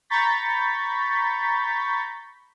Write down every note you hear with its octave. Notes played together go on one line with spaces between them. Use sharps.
A#5 B5 C#6 G6 A6 B6